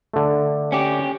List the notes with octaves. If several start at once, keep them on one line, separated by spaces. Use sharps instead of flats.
D3 A3
C#4 G4